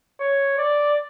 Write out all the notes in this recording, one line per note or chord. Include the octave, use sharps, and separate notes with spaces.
C#5
D5